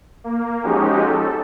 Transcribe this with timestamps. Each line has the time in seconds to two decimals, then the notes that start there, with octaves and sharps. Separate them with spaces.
0.24 A#3
0.63 F3 G#3 C#4 D#4 F#4 G4
1.05 A4